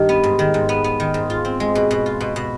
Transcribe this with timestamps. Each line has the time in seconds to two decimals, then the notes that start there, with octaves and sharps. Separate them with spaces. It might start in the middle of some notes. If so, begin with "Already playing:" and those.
Already playing: G2 D#3
0.09 B3
0.24 G#2
0.39 D#3
0.54 G#2
0.69 B3
0.84 B3
1.00 D#3
1.14 G#2
1.30 F4
1.45 C4
1.60 G#3
1.75 B2
1.91 B2
2.06 F4
2.21 B2
2.36 B2